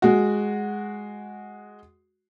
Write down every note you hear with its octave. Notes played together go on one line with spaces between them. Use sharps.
G#3 F#4